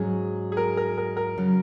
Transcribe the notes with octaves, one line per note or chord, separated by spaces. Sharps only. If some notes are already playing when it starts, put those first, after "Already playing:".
Already playing: G#2 F#3 C#4 G#4
G#4
A#4
A#4
A#4
A#4
C#3 F#3